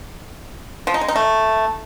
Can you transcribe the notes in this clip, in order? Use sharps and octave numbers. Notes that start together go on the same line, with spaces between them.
F3
D#4
G#3
D#4
A3